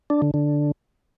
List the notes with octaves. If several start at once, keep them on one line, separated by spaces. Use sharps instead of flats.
D4
D3
D3